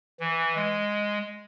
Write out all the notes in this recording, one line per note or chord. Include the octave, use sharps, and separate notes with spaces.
E3
G#3